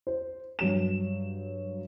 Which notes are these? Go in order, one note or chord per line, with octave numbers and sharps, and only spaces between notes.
C5
G2 F#3 E7